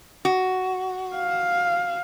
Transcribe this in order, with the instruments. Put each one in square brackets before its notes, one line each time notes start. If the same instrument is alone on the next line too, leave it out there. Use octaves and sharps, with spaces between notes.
[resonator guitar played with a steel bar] F#4
[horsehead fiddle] F5